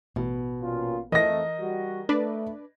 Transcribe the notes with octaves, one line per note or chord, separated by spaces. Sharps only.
A1 B2
A#2 C#4 F4
F2 E3 A3 A#4 D#5 A#6
G3 F#4
A3 D4 B4 D5